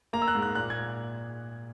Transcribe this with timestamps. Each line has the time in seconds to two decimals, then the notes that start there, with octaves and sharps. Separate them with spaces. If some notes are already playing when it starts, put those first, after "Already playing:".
0.13 A#3 A#5
0.22 E6
0.28 F#6
0.35 G#2
0.42 F#6
0.55 A#2 F#6
0.70 G#6